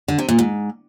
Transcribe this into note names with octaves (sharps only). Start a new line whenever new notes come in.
D3
C3
A#2
G#2